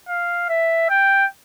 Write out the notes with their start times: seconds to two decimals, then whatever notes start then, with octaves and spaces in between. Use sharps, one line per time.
0.08 F5
0.49 E5
0.90 G5